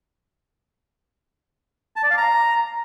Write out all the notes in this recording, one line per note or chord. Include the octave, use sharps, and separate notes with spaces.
A5
D5
F5
A#5